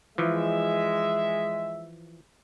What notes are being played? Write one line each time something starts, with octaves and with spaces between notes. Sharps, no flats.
E3 F3 G#3 E5